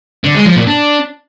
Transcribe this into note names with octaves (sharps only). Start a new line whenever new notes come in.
D3
G#3
F3
A#2
D4